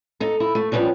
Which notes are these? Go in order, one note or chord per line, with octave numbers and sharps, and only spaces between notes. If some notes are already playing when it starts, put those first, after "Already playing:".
D#4 A4
E4
A3
F3 G3 A#3 B3 C#4 D4